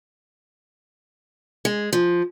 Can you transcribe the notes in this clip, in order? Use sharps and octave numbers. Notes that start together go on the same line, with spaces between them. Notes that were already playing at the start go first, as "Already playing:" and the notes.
G#3
F3